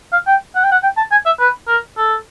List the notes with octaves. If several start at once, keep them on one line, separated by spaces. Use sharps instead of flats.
F5
G5
F#5
G5
F#5
G5
A5
G#5
E5
B4
A#4
A4